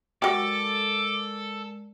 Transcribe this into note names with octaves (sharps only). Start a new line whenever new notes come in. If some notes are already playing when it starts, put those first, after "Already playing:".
F#3 G#3 G4 A4 A#4 D5 D6